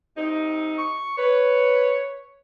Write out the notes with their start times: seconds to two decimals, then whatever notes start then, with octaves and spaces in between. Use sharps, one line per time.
0.17 C3 C4 D#4
0.78 C#6
1.18 B4 C#5